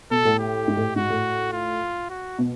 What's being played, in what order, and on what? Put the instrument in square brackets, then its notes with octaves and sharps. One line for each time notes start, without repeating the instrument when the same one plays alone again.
[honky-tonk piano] B2 [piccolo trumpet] A4
[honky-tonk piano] A2
[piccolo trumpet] G4
[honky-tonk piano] G#2
A2
[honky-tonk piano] G#2 [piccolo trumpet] F#4
[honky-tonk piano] A2
[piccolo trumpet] F4
F#4
[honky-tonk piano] B2